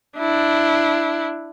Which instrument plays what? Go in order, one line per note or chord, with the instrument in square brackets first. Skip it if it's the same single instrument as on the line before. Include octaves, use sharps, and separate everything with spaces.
[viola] D4 E4